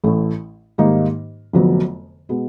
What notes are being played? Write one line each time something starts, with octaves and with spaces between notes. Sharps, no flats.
A1 A2 E3 A3
G#2 D#3 G3 A#3 D#4
F1 F2 D3 F#3 B3
B2 G#3 B3